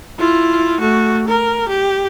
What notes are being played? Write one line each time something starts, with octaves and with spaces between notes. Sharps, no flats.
E4 F4
A3 F#4
A#4
G4